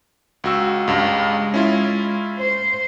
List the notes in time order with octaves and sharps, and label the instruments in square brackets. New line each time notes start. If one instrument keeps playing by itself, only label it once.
[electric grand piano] C#2 F#4 E6
[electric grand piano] C#2 G2 [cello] G#3
[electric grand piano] C#4 E4 F4
[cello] C5